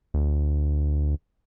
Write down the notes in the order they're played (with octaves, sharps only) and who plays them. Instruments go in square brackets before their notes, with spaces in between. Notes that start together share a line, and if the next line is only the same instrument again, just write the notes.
[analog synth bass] D2